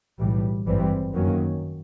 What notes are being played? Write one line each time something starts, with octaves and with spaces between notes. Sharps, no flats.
B1 A2 E3 G3
G#1 G2 E3 G3 C4
F#2 D#3 F#3 A#3 C#4